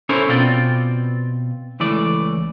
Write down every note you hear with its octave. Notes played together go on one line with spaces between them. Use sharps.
C#4 E4 A4 A#4 C5 C#5
B2 B3 C4 F4 D5 G5
C#2 E3 A3 D5